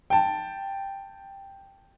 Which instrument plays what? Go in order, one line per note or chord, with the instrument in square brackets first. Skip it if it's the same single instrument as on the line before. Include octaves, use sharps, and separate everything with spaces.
[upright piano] G5 A5